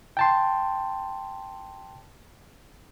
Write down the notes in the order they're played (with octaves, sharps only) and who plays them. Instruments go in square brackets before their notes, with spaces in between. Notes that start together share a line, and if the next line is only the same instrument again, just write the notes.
[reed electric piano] G5 A5 C6